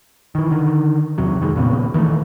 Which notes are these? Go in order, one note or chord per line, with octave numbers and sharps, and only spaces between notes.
D#3 E3
D3 D#3
E2 C3 F#3
F2 D#3 G3 G#3
A#2 C#3 B3
D#3 E3 G3 A3